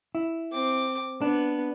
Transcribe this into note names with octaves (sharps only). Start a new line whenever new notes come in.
E4
C4 D6
B3 D4